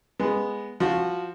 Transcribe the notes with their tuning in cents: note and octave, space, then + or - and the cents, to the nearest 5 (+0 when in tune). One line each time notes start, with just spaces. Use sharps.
G#3 -5 B3 +0
F3 +0 F#4 -15